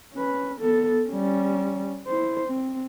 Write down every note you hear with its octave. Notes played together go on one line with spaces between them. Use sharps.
C#4 B4
B3 A4
G3 C#4
E4 C5
C4